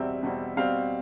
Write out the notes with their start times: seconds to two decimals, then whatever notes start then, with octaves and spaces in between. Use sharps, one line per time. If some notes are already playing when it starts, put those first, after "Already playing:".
Already playing: E2 B2 G3 C4 E5
0.22 E2 B2 G3 C4
0.57 B2 G3 C4 F5